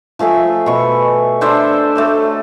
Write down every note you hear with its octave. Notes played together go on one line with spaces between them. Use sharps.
F3 A3 G#4 E5
B2 C#6
D4 A4 C5 E5
A3 F#4 C#5